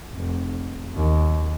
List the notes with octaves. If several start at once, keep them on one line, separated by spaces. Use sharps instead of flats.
F1
D#2